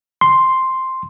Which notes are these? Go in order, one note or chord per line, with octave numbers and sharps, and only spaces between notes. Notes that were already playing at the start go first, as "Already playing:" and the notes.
C6